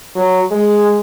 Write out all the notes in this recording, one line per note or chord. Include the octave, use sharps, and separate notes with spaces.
F#3
G#3